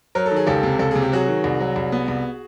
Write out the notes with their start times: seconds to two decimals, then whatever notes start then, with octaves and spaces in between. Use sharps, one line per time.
0.15 F#3 A#4
0.26 A4
0.31 D#3
0.36 G#4
0.46 C#2 G4 A4
0.63 C3
0.79 C#2 A4
0.91 C3 G#4
1.02 G4
1.12 F#3 F#4 G#4
1.28 D#3
1.44 C2
1.60 F#3
1.76 C2
1.92 B3
2.08 C2